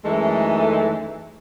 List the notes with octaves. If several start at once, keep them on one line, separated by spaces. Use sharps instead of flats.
F#2 E3 G#3 A3 D#4 A4